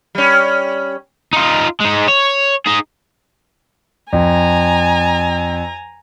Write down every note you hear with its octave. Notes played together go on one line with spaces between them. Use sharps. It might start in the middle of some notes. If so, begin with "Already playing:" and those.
G3 C#4
D#4 F4
G#3 D#4
C#5
D#4 G#4
F2 G#5 A#5